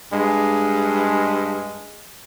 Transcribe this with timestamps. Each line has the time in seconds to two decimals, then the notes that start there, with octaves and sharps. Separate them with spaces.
0.12 G2 G#3